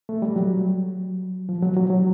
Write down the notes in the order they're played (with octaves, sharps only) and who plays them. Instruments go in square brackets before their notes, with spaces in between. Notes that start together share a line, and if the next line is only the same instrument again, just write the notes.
[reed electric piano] A3
G3
F#3
F3
F#3
F#3
F#3